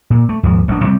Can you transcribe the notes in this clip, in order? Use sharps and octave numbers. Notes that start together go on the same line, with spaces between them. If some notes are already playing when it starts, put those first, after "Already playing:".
A#2
A3
D#2 G#2 F3
A1 F#3 D4
C3 G3 C4